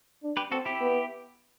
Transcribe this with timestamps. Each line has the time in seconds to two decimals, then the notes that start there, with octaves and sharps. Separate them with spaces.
0.23 D4
0.37 G4 B4
0.51 C4 F#4 A4
0.65 E4 G4
0.80 B3